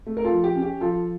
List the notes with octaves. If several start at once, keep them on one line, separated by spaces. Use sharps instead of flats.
A3
A#4
F4 A4
F3
G4
C#4
G4
F3 F4 A4